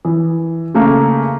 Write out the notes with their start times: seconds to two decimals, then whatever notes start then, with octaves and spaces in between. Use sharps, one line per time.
0.05 E3
0.74 C#3 A3 A#3